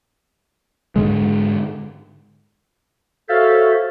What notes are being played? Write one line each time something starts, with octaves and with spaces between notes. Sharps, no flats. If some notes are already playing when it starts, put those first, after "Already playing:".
G#2 D3 G#3
F#4 A4 C5 C#5 E5 F5